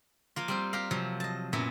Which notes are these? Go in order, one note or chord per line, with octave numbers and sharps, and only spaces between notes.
F3 A#3 F4
G3 C4 C5
G4 A#4 F5
C3 F3 F#3 F5
D#5 A5
F#2 A#2 B3 E4